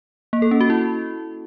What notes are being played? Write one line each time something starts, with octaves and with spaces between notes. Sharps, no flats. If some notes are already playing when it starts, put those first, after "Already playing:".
A#3
A4
C#4
F#4
E4